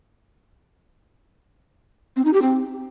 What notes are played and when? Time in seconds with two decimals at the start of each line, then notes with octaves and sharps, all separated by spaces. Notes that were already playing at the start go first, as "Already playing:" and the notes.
2.16 C4
2.25 D#4
2.33 G4
2.42 C4